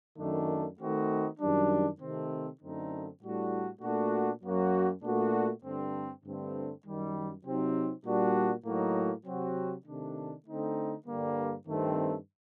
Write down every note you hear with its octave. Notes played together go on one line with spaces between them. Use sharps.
F#2 D#3 A3 D4
D#3 A3 C4 D#4 F#4
F#2 D#3 G3 D4
C3 D#3 A3 C4
F#2 D3 A3 C4 D#4
A2 G3 D4 F#4
A#2 A3 D4 F#4
F#2 F#3 A#3 F#4
A#2 A3 D4 F#4
G2 D3 A3 C4
G2 D3 A3 C4
F#2 D#3 G3
C3 F#3 C4 D#4
A#2 G3 D4 F#4
A2 F#3 A#3 D#4 F#4
C3 F#3 C4 F#4
C3 D#3 A3 D4
D3 A3 C4 D#4
G2 D3 G3 A#3
G2 D#3 A3 C4